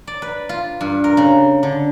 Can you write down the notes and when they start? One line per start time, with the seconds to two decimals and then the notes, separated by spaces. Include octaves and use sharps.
0.07 D5
0.22 B4
0.49 F4
0.81 G2
1.04 A#4
1.17 C#3
1.63 D3